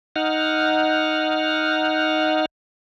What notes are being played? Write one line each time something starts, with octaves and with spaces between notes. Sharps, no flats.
D#4 F#5 F6